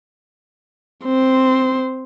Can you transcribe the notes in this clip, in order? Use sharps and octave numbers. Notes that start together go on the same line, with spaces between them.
C4 C5